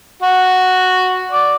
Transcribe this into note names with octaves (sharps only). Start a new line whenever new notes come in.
F#4
D5